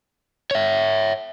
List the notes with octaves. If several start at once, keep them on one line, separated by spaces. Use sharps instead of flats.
C#5 E5